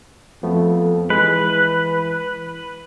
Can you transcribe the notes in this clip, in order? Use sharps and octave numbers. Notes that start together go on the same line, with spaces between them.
F2 F3 A3 B3
E3 G#3 B4